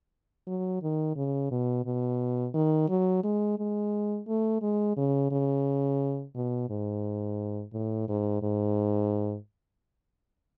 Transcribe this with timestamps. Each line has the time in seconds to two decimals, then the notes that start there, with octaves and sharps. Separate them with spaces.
0.47 F#3
0.82 D#3
1.16 C#3
1.51 B2
1.85 B2
2.55 D#3
2.89 F#3
3.24 G#3
3.58 G#3
4.28 A3
4.62 G#3
4.97 C#3
5.31 C#3
6.35 B2
6.70 G#2
7.73 A2
8.08 G#2
8.43 G#2